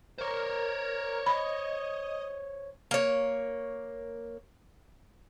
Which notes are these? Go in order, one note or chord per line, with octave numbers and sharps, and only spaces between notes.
A#4 C5 C#5
D#5 B5
A#3 C#5